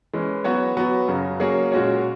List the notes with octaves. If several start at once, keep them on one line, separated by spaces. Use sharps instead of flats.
E3 G#3 C#4
F#3 B3 F#4 C#5
F#3 B3 F#4
F#2 C#3 F#3
F#3 A#3 C#4 G#4 C#5
A#2 G#3 C#4 F#4 C#5